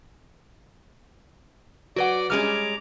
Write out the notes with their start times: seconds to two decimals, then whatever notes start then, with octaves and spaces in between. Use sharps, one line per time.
1.96 F#3 F#4 B4 D5 F#5 D6
2.30 G3 G#3 C#4 A#5 D6 F6